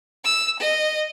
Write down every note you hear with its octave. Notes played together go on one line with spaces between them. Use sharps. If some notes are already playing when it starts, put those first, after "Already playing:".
E6
D#5